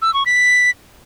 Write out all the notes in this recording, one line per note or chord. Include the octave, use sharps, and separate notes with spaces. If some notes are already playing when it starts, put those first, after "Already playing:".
E6
C#6
B6